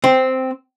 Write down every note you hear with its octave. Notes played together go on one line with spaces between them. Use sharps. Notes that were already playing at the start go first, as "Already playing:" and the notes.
C4